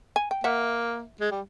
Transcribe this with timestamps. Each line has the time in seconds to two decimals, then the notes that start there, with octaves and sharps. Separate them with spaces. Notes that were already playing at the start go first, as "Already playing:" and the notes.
0.16 G#5
0.31 G5
0.44 A#3 E5 F#5
1.21 G#3
1.31 G3